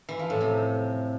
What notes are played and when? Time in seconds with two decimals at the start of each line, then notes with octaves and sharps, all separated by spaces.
0.09 E3
0.19 F3
0.30 A2
0.41 C3